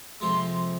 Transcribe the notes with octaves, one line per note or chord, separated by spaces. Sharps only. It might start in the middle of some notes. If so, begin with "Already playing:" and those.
F2 C3 F3 G#3 C6